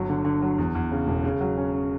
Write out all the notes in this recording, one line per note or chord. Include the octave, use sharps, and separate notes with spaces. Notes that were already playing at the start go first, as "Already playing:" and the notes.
Already playing: G1 F#3
D3
D3
F#3
E2
E2
C#3
E1
C#3
F#3
C#4
C#4